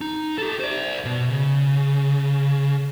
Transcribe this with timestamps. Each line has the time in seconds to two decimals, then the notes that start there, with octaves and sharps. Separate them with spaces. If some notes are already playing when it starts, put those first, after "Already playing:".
0.01 D#4
0.38 G4 A4
0.60 C5 D5
1.05 B2
1.30 C#3